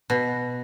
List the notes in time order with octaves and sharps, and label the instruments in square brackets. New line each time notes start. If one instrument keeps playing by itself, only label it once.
[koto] B2